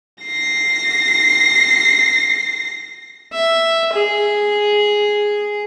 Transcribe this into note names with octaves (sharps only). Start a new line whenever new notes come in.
A#6 C7
E5
G#4